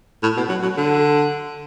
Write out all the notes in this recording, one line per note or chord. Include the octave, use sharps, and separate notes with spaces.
A2
B2
F#3
F#3
D3